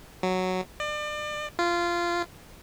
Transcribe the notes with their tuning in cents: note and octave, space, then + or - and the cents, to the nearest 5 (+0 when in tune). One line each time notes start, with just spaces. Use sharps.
F#3 +0
D5 +35
F4 -15